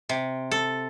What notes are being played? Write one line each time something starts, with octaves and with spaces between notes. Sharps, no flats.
C3
A4